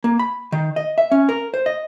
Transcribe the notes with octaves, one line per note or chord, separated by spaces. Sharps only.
A#3
B5
D#3
D#5
E5
C#4
A#4
C5
D#5